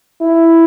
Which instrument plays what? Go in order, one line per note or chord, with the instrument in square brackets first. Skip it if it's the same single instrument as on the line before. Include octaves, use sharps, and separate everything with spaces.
[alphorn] E4